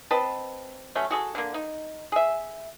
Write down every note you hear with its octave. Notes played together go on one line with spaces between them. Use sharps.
C4 B4 D#5 A5
F#3 A3 C#4
F#4 G#4 A4
D3 A#3
D#4
G#4 E5